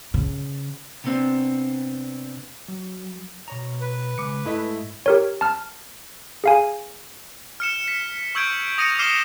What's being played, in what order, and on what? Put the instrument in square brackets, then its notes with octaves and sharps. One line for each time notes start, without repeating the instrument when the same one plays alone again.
[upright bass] C#3
[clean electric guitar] C3 B3 C4 D4
[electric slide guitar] F#3
B2 C#5 A#5
[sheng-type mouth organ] B4
[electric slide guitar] C#3 G#3 [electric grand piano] D6 C#7
[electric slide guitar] G#2 [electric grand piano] A3 E4 D#5
[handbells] G4 A#4 C#5
A5 F6
G#4 F5 G#5
[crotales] F6 C#7 E7
B6
C#6 E6 G6 G#6 D7
D#6 A#6 C#7 D#7 F7
D6 F6 C7 D#7 E7 G7